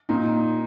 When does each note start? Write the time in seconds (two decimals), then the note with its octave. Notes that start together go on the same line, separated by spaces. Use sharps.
0.09 A#2 D#4